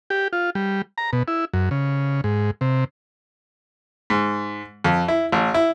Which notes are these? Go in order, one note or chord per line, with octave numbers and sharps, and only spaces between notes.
G4
F4
G3
A#5
B2
E4
F#2
C#3
G#2
C3
G#2
F2
E4
A1
E4